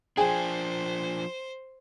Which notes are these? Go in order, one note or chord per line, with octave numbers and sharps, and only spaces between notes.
F3 D4 G#4 C5 G5 G#5